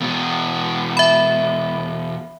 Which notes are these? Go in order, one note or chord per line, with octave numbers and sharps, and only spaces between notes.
E2 B2
E5 B5